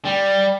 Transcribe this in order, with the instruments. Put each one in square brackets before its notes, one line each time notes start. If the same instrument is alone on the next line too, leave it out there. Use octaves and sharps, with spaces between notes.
[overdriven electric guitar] G3